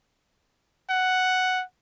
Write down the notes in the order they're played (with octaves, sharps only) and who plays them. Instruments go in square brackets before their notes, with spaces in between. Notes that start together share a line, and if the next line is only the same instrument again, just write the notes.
[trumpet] F#5